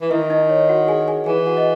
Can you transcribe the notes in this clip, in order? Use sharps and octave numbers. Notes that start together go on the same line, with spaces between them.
E3
D#3 E4 E5
D#4 D#5
C#5
F#4 F#5
G#4 G#5
G#4 G#5
E3 G#4 G#5
F#4 F#5
D#5